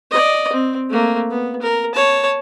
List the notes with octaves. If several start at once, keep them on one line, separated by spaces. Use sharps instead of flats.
D5 D#5
C4
A3 A#3
B3
A#4
C#5 A5